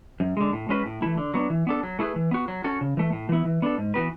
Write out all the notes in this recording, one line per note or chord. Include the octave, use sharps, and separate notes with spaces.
F#2
D3 G#3
A2
G#3 C#4 F#4 B4
A2
E3 A3 E4
D3
F#3 B3 D4
E3
B3 D4 A4
F#3
A3 E4 G#4 B4
E3
B3 F#4
F#3
C#4 F#4 A4
C#3
E3 A3
A2
E3 B3 E4
E3
B3 D4 A4
G#2
E3 B3 F#4 B4